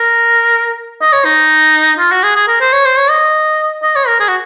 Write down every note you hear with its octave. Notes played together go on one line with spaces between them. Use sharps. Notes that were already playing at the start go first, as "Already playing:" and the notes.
Already playing: A#4
D#5
C#5
D#4
F4
F#4
G#4
G#4
A#4
C5
C#5
C5
C#5
D#5
D#5
C#5
A#4
G#4
F#4